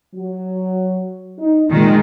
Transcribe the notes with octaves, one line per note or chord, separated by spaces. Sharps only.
F#3
D#4
A#2 D#3 G#3